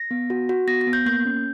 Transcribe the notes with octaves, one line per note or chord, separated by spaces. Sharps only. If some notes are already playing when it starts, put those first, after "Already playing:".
Already playing: A#6
B3
F#4
F#4
B3 A#6
A#6
B3
G6
A#3 G6
C#4